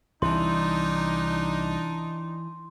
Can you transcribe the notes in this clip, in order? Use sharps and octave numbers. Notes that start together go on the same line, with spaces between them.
C2 E3 D4 D#4 C6